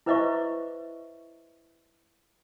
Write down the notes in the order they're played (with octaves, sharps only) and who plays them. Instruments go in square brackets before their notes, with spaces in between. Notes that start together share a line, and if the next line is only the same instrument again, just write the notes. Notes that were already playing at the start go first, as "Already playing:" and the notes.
[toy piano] E4 B4 C5 D#5 E5 C#6